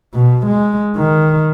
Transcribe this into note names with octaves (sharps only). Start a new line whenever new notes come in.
B2
G#3
D#3